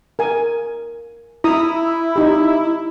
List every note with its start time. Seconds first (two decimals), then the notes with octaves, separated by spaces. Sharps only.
0.19 A#4 G#5
1.44 E4 A#5 D#6
2.16 D#4 G4